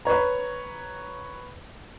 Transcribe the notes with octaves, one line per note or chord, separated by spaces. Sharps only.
B4 C#5 A#5